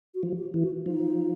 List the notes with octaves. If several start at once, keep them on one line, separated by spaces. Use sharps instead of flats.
F#4
F3
G4
E3
F#4
F3 D#4